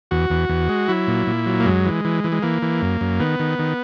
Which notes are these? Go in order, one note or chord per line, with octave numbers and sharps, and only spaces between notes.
E2 F#4
E2
E2
G#3
F#3 E4
A#2
A#2
F#3
A#3
F#2 G#3
E3
E3
E3
G#3
E3 A#3
E3
F#2
F#2
D#3 B3
D#3
D#3